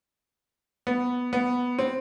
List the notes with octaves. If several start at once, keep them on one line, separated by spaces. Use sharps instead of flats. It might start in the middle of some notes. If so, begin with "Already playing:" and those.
B3
B3
C4